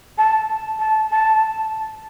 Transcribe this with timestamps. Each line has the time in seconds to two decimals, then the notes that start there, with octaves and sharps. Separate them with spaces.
0.18 A5
0.79 A5
1.11 A5